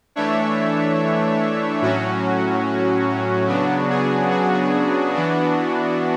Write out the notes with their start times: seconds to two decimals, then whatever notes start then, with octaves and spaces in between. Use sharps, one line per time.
0.16 E3 A3 D4 C#5 E5
1.81 A2 F#3 C#4 F#4
3.48 C#3 F#3 B3 D4 F#4
3.90 G#4
4.31 F#4
5.15 E3 B3 D4